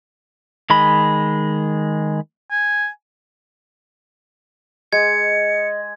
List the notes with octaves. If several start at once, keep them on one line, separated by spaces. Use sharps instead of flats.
D#3 G#3 B5
G#5
G#3 D#5 G#6 C#7